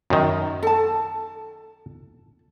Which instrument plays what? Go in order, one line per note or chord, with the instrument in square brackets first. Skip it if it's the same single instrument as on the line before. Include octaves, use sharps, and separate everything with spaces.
[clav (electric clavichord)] F#2 D#3
[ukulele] A4 A5